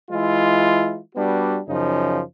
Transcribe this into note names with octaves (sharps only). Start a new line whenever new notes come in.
E3 G#3 E4 F4
G3 B3 D4 F#4
F#2 C#3 F3 D#4